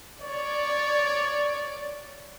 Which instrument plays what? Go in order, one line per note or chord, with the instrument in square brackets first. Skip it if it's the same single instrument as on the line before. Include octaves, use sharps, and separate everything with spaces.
[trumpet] C#5 [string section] D5